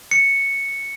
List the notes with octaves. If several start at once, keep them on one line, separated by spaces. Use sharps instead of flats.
C#7